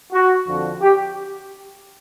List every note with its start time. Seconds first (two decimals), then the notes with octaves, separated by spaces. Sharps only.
0.13 F#4
0.47 F2 D3 F3
0.82 G4